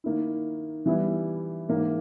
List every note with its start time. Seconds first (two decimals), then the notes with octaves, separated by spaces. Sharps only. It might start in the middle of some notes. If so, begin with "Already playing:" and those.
0.04 D#3 A#3 E4
0.86 E3 G3 B3 E4
1.69 G#2 E3 A#3